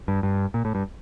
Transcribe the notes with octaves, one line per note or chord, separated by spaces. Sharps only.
G2
G2
A#2
A2
G2